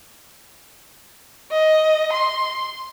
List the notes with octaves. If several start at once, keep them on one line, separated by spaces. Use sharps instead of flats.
D#5
C6